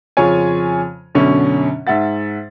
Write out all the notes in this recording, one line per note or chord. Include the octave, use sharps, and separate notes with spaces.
F2 C#3 F4 C#5 G#5
F#2 B2 D3 C#4
G#2 E5 F#5 A6